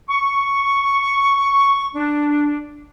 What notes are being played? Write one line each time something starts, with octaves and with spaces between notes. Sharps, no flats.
C#6
D4